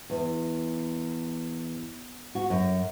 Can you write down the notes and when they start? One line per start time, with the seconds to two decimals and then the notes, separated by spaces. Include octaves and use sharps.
0.10 E2
2.35 F#4
2.50 F#2